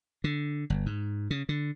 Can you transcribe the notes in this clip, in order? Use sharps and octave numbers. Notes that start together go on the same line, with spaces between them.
D3
G1
G#2
C#3
D3